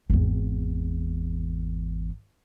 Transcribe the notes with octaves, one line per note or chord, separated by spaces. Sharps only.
G#1 E2